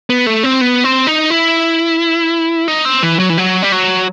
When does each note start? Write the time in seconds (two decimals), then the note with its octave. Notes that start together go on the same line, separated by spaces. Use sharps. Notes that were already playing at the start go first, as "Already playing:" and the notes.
0.10 B3
0.26 A3
0.43 C4
0.61 B3
0.84 C4
1.07 D#4
1.30 E4
2.68 D#4
2.85 C4
3.03 E3
3.19 F#3
3.30 E3
3.38 F#3
3.63 G3
3.72 F#3